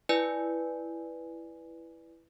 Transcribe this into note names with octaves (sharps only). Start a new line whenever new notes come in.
E4 B4 D5 G#5